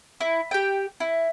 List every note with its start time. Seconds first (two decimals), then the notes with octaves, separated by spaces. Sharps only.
0.21 E4
0.51 G4 G5
1.00 E4